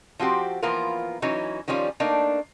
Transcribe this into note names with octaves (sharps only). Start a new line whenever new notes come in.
F3 C4 F#4 G4
E3 F3 A#3 B3 F4 A#4
E3 F#3 C#4 D#4
D#3 F3 G3 C#4 F4
A3 A#3 D4 D#4